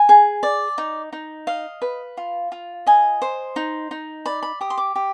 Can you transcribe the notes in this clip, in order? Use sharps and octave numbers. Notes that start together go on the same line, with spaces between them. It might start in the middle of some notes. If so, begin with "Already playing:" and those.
Already playing: G#5
G#4
D5
D#4
D#4
D#5 F5
B4
F4
F4
D#5 G#5
C5
D#4
D#4
D5 B5
B5
G4 D#6
C6
D6
G4